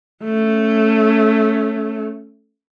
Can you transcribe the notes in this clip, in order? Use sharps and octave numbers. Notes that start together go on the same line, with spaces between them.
A3 C#4